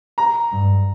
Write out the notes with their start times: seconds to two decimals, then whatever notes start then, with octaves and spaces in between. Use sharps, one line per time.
0.18 A#5
0.52 G2